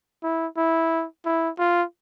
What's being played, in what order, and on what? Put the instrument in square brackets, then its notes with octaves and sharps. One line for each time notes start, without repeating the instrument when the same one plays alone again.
[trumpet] E4
E4
E4
F4